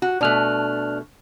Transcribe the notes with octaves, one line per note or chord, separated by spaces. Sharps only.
F#4
B2 A3 D4 F6 F#6